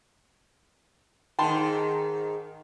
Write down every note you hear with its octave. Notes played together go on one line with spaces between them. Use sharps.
G#2 D#3 G5 A5 C6